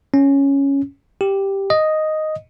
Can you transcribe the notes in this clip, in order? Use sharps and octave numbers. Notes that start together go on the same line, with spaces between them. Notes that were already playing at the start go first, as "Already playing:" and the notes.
C#4
G4
D#5